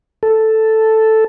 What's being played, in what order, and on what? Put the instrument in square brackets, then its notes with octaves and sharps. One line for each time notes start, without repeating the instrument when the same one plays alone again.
[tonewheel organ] A4